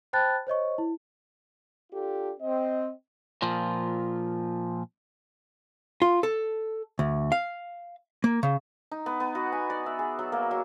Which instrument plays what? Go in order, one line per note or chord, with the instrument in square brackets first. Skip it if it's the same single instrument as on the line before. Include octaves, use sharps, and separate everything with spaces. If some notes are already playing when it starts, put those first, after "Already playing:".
[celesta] C5 G5 A5 B5 F#6 A6
C5 C#5 D#5 C#6
E4
[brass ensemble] D4 F4 G4 A4
C4 D#5
[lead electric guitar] A#2 F3
[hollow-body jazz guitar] F4
A4
D2
F5
A#3
C#3
[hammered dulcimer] D#4
B3
B3
F#4
G#5
D5
E5
G#4
F#3
A#3
F#3